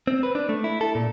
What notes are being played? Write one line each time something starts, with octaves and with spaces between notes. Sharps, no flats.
C4
B4
D4
A3
E4
A4
A#2